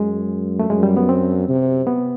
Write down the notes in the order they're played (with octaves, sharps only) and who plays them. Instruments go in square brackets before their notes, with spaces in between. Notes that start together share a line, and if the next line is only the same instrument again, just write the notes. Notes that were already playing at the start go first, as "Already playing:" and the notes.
Already playing: [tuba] F#2 [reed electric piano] G#3
[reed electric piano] A3
[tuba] F#2 [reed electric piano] G#3
[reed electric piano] G3
B3
C4
[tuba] C3
[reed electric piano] B3